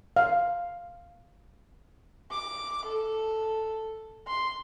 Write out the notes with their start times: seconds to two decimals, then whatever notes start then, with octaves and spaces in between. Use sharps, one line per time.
0.16 F5
2.31 D6
2.85 A4
4.27 C6